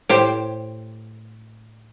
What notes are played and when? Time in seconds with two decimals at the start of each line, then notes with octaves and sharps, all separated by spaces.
0.09 A2 G4 C5